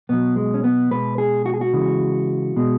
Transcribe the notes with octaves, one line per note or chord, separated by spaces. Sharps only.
B2 F#3 B3
G#3
C#4
B3
B2 G#3 B4
G#4
F#4
G#4
F#4
C#3 E3 G#3
B2 G#3